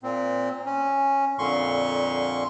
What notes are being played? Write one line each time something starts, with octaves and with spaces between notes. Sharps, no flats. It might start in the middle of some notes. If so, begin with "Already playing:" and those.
A#2 C4
C#4
F2 A#2 D3 C6 C#6